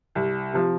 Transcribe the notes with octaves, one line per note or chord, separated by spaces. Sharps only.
C2
C3 F3